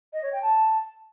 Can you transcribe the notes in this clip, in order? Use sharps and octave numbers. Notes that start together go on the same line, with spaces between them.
D#5
C#5
G5
A5